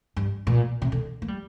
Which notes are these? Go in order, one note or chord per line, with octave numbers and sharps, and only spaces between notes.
G2
A#2
C3
D3
A#3
G3